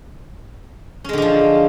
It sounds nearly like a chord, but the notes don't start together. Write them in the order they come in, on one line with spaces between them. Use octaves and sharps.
C#4 G#3 D3 D4 F3